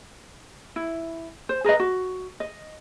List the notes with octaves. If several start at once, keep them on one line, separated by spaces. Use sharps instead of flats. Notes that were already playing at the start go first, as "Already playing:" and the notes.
E4
C5
G#4 A#4 B4 D#5
F#4
D#5